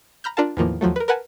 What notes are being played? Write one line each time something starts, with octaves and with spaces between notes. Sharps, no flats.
A#5 B5 F6 G6
D4 F4 A#4 F5 A5
E2 A2 D#3 F3 A#3
D#2 F3 F#3 A3
A#4 B4
A#4 B4 F#5 G#5 A5